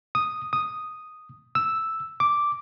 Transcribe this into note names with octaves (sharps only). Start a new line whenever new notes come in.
D#6
D#6
E6
D6